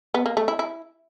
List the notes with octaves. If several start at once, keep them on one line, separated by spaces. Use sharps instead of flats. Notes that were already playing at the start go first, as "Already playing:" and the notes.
B3
A#3
A3
E4
E4